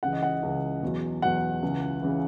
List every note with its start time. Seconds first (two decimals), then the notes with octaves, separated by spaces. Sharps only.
0.03 C#2 C#3 E3 F#5
0.13 D#5
0.22 F#5
0.43 C#2 C#3 E3
0.83 E2 B2 F#3
1.22 E2 B2 F#3 F#5
1.62 C#2 C#3 E3
2.02 C#3 E3